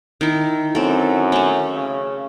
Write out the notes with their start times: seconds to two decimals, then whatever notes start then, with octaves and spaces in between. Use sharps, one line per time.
0.21 D#3 E4
0.75 F#2 C4 A4
1.32 A3 C#4
1.75 C#3